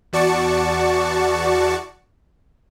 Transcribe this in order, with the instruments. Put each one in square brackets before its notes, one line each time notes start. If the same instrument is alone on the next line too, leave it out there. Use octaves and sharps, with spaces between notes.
[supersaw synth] E2 F#4 D5 A5 C#6 C#7